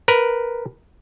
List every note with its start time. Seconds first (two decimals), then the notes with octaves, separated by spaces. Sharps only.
0.08 A#4 B4